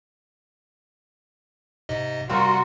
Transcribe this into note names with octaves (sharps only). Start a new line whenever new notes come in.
G#2 C3 D#5
C3 G3 C4 F4 F#4 A#4 C6